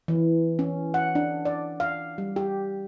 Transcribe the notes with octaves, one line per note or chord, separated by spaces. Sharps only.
E3
C#4
F#5
D4
D5
F5
G3
G4